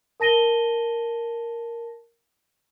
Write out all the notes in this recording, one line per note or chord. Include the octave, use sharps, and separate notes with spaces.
A#4 A5 A#6 D#7 G7